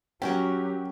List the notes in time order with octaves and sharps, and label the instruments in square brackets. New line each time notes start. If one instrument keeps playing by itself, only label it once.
[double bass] F#3 [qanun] C#4 F#4 A#4 [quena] G4 [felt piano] G5